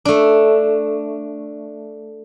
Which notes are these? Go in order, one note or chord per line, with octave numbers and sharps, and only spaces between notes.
A3 D4